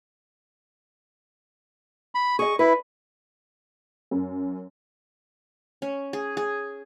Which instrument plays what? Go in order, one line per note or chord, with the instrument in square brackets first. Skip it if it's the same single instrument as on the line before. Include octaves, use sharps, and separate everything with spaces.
[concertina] B5
[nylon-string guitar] G#4 D#5 [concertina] C#6
[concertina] E4 [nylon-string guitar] B4
[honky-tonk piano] F#2
[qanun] C#4
G#4
G#4